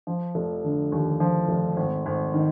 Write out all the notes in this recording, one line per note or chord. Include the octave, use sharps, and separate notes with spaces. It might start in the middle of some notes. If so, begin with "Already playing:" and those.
F3
F1
D3
D#2
F3
F1
G#1
G#1
D#3